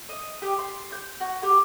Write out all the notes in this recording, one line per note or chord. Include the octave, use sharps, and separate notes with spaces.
D#5
G4
C6
G6
F#4
G4